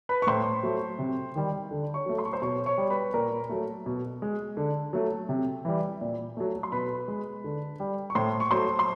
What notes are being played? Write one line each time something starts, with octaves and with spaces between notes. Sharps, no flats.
B4 B5
C#6
A2 C5 C6
F#3 A3
C3
D#3 G3
D3
C#5 C#6
F#3 A3
C6
C#6
C5 C6
B2 C#5 C#6
C#5 C#6
G3
B4 B5
A#2 A#4 A#5
F#3 A3
B2
G#3
D3
F#3 A3
C3
E3 G3
A#2
F#3 A3
C6
B2 B4 B5
G#3
D3
G3
C#6
A2 C5 C6
C#6
F#3 A3 C5 C6
C6